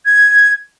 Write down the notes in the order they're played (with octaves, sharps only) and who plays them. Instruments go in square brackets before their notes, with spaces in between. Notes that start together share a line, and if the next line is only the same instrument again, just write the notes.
[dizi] G#6